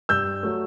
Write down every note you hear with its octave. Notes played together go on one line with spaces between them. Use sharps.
G2 E6 G6
F#3 A3